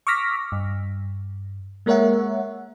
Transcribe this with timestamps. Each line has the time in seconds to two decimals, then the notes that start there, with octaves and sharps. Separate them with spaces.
0.07 C#6 D6 E6 F6 A#6 B6
0.52 G2
1.86 G#3 A#3 A#4 C#5 E5 F#5